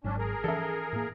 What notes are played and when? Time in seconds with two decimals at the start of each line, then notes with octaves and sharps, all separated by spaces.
0.04 G#1 G#2 F#3 C#4 D4
0.18 G#4 A#4
0.44 E3 F3 C#4 A4 E5
0.93 A2 A#3